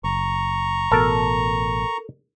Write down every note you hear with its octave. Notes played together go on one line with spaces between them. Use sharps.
F#1 A#5 C#6
A1 B2 A4 A#4 A5